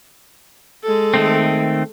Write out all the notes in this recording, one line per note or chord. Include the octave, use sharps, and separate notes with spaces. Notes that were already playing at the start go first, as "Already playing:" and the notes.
G#3 A4
D#3 A3 C4